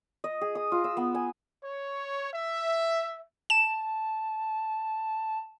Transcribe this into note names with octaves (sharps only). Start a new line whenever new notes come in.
D#5
G#4
D#6
F4
E6
B3
G#5
C#5
E5
A5 E7